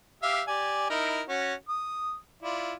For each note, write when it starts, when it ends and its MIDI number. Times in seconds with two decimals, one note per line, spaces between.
0.22 0.42 67
0.22 0.42 76
0.22 0.42 77
0.48 0.90 67
0.48 0.90 74
0.48 0.90 80
0.90 1.22 63
0.90 1.22 64
0.90 1.22 70
1.29 1.54 61
1.29 1.54 66
1.69 2.15 87
2.42 2.73 64
2.42 2.73 65
2.42 2.73 74